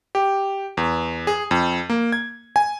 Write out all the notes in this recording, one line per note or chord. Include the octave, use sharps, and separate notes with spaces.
G4
E2
G#4
F2
A#3
G#6
G#5